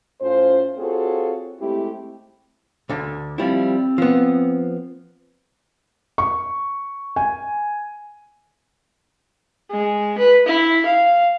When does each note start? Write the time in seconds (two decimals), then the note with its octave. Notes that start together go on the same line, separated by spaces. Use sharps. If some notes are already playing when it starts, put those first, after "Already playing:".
0.21 A2 C#4 F4 C5
0.78 C4 F4 F#4 G#4 A4 C#5
1.60 G#3 A3 C4 E4 G4
2.89 D2 D3
3.38 F3 G3 C4 E4
3.98 F3 B3
6.18 C#6
7.16 G#5
9.71 G#3
10.18 B4
10.46 E4
10.86 F5